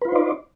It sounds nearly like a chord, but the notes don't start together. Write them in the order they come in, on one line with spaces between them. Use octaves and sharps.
B4 F4 C5 D#4 D5